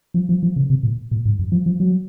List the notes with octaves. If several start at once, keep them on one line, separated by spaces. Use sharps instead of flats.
F3
F3
F3
C#3
C3
A#2
A#2
G#2
F#2
F3
F3
F#3